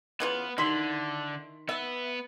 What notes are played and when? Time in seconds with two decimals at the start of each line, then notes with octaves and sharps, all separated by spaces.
0.20 C#3 E3 B3 F4
0.58 D3 D#3 E4 C6 B6
1.69 B3 E5